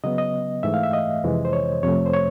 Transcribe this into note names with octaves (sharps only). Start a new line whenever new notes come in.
C#3 F#3 B3 D#5
D#5
G#2 E3 A3 E5
F5
E5
D#5
F2 C3 E3 G#3
C5
C#5
F2 C3 F3 A3 C#5
C5
C#5